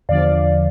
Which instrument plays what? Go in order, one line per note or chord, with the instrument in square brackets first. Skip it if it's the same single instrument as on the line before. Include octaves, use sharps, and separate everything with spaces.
[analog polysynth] E2 D3 F3 D5 F5